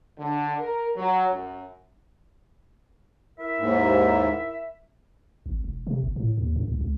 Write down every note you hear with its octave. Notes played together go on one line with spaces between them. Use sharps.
D3
A#4
F#3
F#2
E4 A#4 E5
D#2 G#2
G#1
E1
C3
F#1
A2
D#2
F#2
C2
C#2